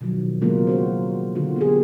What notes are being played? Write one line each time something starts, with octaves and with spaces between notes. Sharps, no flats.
B2 D#3 F3 F#3
C#3 F#3 G#3 A#3 B3 F4
C#4 F#4 C5
D3 F4 F#4
B3 G4 G#4